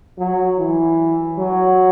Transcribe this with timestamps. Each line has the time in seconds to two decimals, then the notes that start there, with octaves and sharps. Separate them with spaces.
0.18 F#3
0.58 E3
1.38 F#3